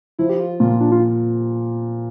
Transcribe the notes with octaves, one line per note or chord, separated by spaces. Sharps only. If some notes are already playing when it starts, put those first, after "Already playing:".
F3 E4
G4
F4
A#2 F4
D4
F4